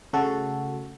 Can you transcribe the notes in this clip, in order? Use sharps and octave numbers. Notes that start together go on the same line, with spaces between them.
C#3 A3 F#4 A4